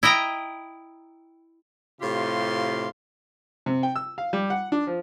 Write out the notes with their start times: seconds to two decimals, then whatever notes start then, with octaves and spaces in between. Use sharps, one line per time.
0.03 E4 D#5 G5 A#5
2.02 A2 C3 F4 G4 F5 C6
3.66 C3
3.83 G5
3.96 E6
4.18 F5
4.33 G3
4.50 F#5
4.72 D4
4.87 F3